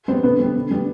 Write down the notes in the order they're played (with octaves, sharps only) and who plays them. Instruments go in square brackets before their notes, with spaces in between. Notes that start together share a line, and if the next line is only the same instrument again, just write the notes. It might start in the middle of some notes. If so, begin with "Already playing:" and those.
[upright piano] G3 B3 C4 C5
D3 B3 B4
G3 B3
D3
G3 B3